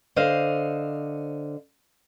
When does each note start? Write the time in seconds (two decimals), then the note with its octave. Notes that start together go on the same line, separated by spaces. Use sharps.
0.16 D3 C5 D#5 F5